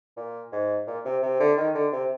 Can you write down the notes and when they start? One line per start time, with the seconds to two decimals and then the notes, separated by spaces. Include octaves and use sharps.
0.17 A#2
0.52 G#2
0.87 A#2
1.05 C3
1.23 C3
1.40 D3
1.57 D#3
1.75 D3
1.93 C3